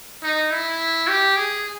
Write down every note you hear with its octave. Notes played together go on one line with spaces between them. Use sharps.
D#4
E4
G4
G#4